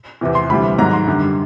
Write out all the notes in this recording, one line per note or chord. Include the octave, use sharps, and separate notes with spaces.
E2 C3 E3
C6
D2 C3 E3 G3 B5
G#2 D#3 F#3 A#5
C6
F#2 D3 G3